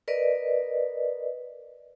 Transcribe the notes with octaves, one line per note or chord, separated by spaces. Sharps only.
A#4 B4 D5 D#5